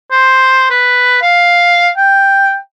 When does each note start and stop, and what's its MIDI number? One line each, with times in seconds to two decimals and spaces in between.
0.11 0.68 72
0.70 1.17 71
1.22 1.90 77
1.97 2.56 79